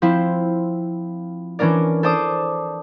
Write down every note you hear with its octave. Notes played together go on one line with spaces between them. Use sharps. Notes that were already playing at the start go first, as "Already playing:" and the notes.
F3 C4 E4
E3 C#4 D4 A#4 D5
A4 C5 D5 A5 D6 D#6